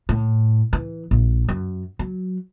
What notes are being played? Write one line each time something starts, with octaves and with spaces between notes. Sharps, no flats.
A2
E3
A#1
F#2
F#3